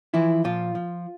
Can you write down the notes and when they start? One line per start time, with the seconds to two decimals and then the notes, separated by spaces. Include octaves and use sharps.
0.14 E3 F3 E4
0.44 A#2 F3 F4
0.75 F3